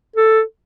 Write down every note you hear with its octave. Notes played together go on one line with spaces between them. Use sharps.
A4